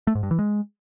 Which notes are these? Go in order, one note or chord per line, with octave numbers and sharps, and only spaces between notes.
A3
G#2
G2
E3
G#3